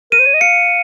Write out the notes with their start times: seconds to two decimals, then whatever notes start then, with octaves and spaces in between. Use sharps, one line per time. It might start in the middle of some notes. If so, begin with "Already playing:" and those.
0.12 A#4 D#7
0.19 C5
0.26 C#5
0.34 D#5
0.41 F5 C#7